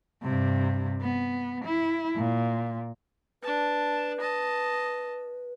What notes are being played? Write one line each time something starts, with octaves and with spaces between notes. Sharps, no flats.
G2 C3
B3
E4
A#2
D4 B4 A5
D#5 A5